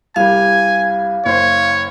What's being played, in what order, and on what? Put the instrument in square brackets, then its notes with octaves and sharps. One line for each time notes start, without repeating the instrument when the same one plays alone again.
[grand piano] C2 G3 [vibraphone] F5 [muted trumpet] G#5
[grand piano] F#1 C5 [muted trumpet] C#5